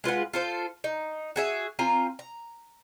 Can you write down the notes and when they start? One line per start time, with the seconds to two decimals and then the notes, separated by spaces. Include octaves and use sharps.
0.04 G#3 F4 B4 F#5
0.33 F4 A4 C5
0.84 D#4
1.36 F#4 G#4 E5
1.79 C4 F4 G#5 A#5
2.19 A#5